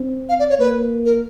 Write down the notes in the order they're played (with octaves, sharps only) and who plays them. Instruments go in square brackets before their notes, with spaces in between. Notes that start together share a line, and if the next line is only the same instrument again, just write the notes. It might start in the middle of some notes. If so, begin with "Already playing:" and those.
Already playing: [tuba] C4
[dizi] F5
D5
C#5
[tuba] A#3 [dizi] B4
[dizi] A#4